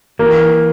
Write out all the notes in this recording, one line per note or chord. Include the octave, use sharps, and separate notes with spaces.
E3 A#3